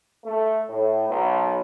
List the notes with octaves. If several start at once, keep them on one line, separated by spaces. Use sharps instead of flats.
A3
A2
B1